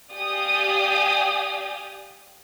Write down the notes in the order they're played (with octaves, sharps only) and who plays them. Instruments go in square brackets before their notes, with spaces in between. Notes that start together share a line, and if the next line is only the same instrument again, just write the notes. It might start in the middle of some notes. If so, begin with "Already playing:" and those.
[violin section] G4 D5 F5 G5 G#5 D#6